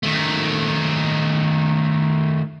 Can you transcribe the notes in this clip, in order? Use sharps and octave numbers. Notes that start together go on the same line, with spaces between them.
D#3 A3